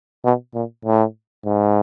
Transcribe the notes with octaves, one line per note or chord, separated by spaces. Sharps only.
B2
A#2
A2
G#2